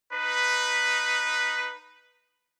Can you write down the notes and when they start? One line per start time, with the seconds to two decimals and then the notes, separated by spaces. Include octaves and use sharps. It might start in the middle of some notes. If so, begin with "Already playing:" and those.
0.12 D#4 B4